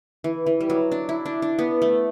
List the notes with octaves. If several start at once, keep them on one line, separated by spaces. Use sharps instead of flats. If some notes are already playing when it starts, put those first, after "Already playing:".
E3
E3
G3
F#3
D4
E4
D4
D4
B3
A3